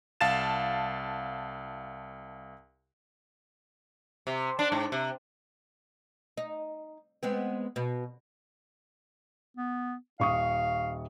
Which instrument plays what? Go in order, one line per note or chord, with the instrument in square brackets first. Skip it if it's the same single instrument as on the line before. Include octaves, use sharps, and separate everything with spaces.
[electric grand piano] C2 F5 A5 A6 E7
[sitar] C3
D4
G#2
C3
[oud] D#4
G#3 B3 C4
B2
[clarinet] B3
[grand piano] D#1 C#6 D#6 [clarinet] F5